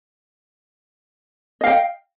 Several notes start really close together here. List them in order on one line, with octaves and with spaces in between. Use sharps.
D#5 F5 G5